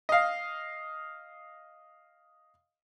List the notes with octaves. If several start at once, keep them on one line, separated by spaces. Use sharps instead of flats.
D#5 F5